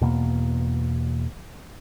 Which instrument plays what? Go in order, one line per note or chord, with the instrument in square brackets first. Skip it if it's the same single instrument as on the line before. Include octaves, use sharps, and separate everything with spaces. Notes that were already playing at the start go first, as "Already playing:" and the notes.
[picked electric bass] E2 B2 A#3